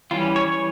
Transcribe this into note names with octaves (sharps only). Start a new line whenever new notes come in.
E3 G3 C#4 F4
C#5
C#5